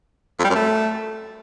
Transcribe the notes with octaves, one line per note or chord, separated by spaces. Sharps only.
F2
G3
F#2
A3